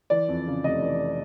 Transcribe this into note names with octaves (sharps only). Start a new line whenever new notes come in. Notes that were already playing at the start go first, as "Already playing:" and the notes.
E3 D5
F2
C#3
F1 D#5
E3